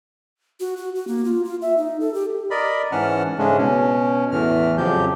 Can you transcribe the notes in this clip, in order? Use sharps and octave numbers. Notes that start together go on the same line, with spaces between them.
F#4
F#4
F#4
A#3
F4
F4
E5
D#4
A4
G4
A#4 D5 D#5 B5
G#2 E3 C#4 F#5 A5 F6
G#2 C#3 G#3 A3 C#4 D4
B2 C#4
E2 A2 E3 A3 F6
F2 C#3 F3 F#3 G4 G6